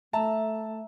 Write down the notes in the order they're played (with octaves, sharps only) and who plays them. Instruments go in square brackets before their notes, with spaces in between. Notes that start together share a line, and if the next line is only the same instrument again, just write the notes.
[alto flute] A3 [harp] E5 A#5 [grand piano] A5